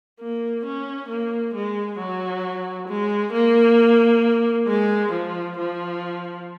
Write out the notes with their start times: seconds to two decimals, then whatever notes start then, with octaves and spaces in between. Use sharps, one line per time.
0.20 A#3
0.65 C#4
1.09 A#3
1.54 G#3
1.98 F#3
2.88 G#3
3.33 A#3
4.67 G#3
5.12 F3
5.57 F3